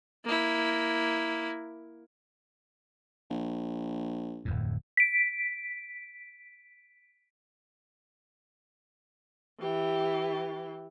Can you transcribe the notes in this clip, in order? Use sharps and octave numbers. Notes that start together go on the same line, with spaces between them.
A#3 E4
A#1
D1 F2 A2
B6 D7
E3 G4